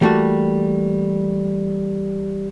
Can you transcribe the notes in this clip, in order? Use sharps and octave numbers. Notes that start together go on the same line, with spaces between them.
E3 G3 A3 A#3 F#4